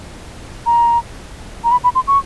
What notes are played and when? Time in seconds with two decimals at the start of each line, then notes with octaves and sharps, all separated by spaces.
0.66 A#5
1.64 A#5
1.71 B5
1.84 B5
1.95 C6
2.07 C#6